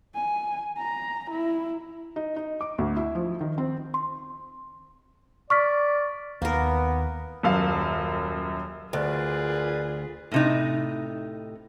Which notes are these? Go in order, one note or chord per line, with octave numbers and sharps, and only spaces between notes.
G#5
A#5
E4
D#4
D#4
D6
D2
E4
F3
D#3
C4
C6
D5 C#6 F6 B6
D#2 A#3 B3 A#4
D#1 F#2 F5
D2 F4 G#4 A#4 B4 D5
A2 C3 D#4